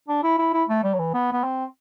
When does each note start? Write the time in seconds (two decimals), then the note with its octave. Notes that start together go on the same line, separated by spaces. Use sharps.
0.08 D4
0.23 E4
0.38 E4
0.53 E4
0.69 A3
0.83 G3
0.94 F#3
0.99 E3
1.14 B3
1.33 B3
1.44 C4